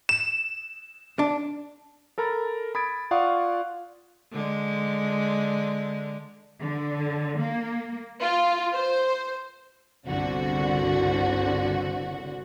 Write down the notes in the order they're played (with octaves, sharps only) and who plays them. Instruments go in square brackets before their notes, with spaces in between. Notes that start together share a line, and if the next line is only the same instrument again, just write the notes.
[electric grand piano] E7
[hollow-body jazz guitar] D4
[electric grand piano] A4 A#4 A#5 B5 A6
B5 D#6 G#6 A6 D7
F4 D5 F5 F#5 C#6 D#6
[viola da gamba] D3 G#3
[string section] D3
A#3
F4
C5
G1 C2 D3 F#4